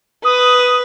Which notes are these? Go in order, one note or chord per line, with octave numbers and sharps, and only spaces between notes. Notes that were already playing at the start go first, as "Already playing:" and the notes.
B4 D#6